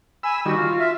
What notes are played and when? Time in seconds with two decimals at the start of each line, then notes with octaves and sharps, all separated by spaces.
0.23 G#5 B5 E6
0.45 D#3 G3 F#4
0.58 F4
0.78 E5